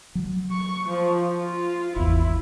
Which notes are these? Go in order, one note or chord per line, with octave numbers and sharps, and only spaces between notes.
F#3
C#6
F3
F4
G#1 E2 E4